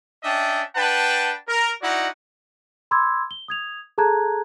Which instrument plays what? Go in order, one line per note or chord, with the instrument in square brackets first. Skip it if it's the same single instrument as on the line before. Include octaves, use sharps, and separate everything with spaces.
[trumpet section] C#4 D4 D#5 E5 G5
D4 B4 F#5 G5 A5
A#4
D#4 E4 F#4 D5 F#5
[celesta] B5 C6 D6 E6 G#6
G7
D#6 G#6 F7
G#4 A4 A5 A#5 F#6 G#6